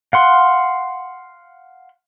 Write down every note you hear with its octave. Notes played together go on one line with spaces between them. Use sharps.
F5 F#5 C6